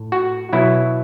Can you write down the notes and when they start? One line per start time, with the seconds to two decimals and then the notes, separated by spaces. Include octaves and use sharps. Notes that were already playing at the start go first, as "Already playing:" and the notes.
Already playing: A2
0.12 F#4
0.53 B2 F#3 E4